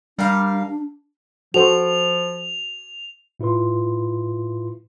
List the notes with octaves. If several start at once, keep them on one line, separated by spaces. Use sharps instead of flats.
G3 D4 A#4 F5
F3 F#4 A4 C5 F7
A2 E4 F4 B4 C6